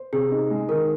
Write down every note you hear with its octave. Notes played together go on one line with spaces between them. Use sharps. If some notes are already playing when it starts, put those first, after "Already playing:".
Already playing: C5
C3 G#4
D#4
G#3
D#3 A#4